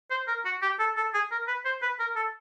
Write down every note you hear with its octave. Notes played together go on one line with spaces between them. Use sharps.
C5
A#4
F#4
G4
A4
A4
G#4
A#4
B4
C5
B4
A#4
A4